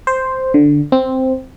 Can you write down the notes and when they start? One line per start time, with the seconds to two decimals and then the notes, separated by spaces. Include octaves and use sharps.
0.07 C5
0.54 D3
0.92 C4